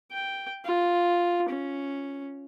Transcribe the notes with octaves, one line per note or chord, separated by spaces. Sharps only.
G5
F4
C#4